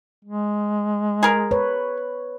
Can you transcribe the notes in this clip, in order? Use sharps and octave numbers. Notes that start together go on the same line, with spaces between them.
G#3
G#4 A#4
B4 C#5